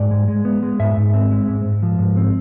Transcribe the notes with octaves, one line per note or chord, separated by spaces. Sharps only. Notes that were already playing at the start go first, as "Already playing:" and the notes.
Already playing: G#2 D5
G#3
G#3
B3
G#3
G#2 E5
G#2
C4
G#3
G#2
G#2
F3
G#2
C4